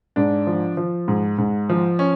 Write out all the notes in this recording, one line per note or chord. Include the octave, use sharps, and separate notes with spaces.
G#2 D4
F3
F3
G#2
G#2
F3
C#4